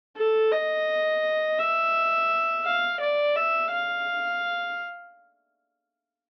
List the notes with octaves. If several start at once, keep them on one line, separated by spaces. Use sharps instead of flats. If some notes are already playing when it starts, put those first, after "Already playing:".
A4
D#5
E5
F5
D5
E5
F5